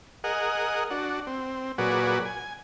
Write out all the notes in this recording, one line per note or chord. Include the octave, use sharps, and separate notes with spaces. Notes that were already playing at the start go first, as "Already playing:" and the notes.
G#4 A#4 D#5 F#5
D4 F#4
C4
A#2 F#3 F#4 G#4 B4 D5
G#5